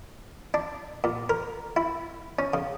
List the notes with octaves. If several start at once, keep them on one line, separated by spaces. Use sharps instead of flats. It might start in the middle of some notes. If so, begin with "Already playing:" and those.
D4
A#2
A#4
E4
C#4
C#3